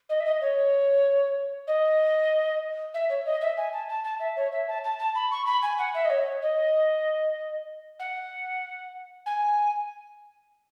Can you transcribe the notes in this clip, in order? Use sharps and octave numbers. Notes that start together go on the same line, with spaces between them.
D#5
E5
D#5
C#5
D#5
E5
C#5
D#5
E5
G#5
A5
A5
A5
E5
C#5
E5
A5
A5
A5
B5
C#6
B5
G#5
F#5
E5
D#5
C#5
D#5
F#5
G#5